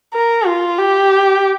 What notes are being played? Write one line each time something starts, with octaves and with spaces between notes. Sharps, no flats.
A#4
F4
G4